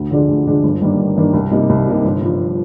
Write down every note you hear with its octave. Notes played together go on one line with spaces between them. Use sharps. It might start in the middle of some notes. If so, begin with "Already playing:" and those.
Already playing: D2
D3 F3 G#3 D4
D2
D3 F3 G#3 D4
G1
G2 D#3 A#3 D4
G1
G2 D#3 A#3 D4
C2
C3 G3 A#3 D#4
C2
C3 G3 A#3 D#4
G1
G2 F3